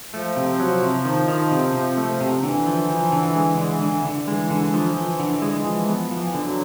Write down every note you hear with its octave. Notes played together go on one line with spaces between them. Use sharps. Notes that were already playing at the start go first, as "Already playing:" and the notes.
F3 A3
C3
F#3
C3
D#3
D#3
C3
C3
A3
C3
D3 E3
F3
F3
D3
G#3
D3
D3
D3
E3 G#3
D3
F3
F3
D3
G#3
F3
B3
E3 F3
D3
F#3